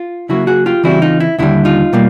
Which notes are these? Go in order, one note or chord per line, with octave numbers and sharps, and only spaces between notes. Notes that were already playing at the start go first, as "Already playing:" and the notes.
Already playing: F4
C#3 F#3 A#3 E4 F#4
F#4 G#4
F4 G4
C#3 E3 G3 C4 E4 F#4
D#4 F4
E4
D#2 D3 G3 E4
D#4 F4
B2 G3 A#3